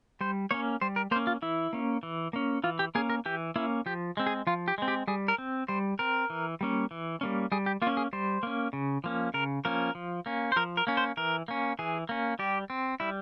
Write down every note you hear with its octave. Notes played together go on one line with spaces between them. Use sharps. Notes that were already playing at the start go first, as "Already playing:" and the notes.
G3 C5
A#3 C#4 C#5
G3 C5
A#4
A#3 C#4 C5
F4
E3 E4
A#3 C#4
E3
A#3 C#4
E3 F4
G4
A#3 C#4 G#4
A#4
E3 G4
A#3 C#4 E4
F3 G4
G#3 C4
G#4
F3 F4
G4
G#3 C4
G4
G3 G#4
A#4
C4
G3 C5
C4 A#4
E3
G3 A#3 C#4
E3
G3 A#3 C#4
G3 G#4
G4
A#3 F4
C#4
G#4
G3 C5
A#3 C#4
C#3
F3 A#3 C#4
C#3 A#4
F3 A#3 C#4 A#4
F3
A#3 C#4
C5
F3 A#4
A#4
A#3 C#4
C5
E3 A#4
A#3 C#4
E3 G#4
A#3 C#4
G3 G4
C4
G3 E4